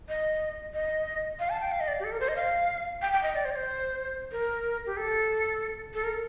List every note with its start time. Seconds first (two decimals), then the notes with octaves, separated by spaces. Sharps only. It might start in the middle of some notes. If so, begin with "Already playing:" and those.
0.09 D#5
0.74 D#5
1.40 F5
1.50 A5
1.61 G5
1.71 F5
1.80 D#5
1.88 D5
2.00 G4
2.04 A4
2.12 A#4
2.20 C5
2.28 D#5
2.36 F5
3.02 G5
3.12 G5
3.23 D#5
3.34 D5
3.45 C5
3.51 D5
3.56 C5
4.32 A#4
4.86 G4
4.97 A4
5.94 A4
6.04 A#4